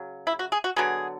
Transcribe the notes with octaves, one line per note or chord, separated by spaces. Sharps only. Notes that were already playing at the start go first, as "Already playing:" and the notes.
Already playing: C#3 F#3
E4
F#4
G#4
F#4
D3 F#3 B3 G#4